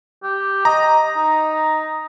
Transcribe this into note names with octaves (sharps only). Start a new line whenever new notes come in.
G4
D#5 A#5
D#4